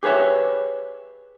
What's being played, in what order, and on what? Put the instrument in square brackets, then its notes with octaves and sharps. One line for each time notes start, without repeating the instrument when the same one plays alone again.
[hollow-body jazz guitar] G4 G#4 B4 C#5 E5